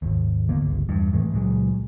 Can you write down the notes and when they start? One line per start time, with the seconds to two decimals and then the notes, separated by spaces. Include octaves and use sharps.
0.02 G#1 D#2
0.49 D3 A#3 B3
0.61 G1 C#2
0.89 E2 G2
1.13 A2 E3 G#3 A3
1.33 C#2 A#2 F#3 G#3